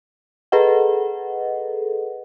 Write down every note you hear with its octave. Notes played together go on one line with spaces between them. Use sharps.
G#4 A4 B4 D#5 F#5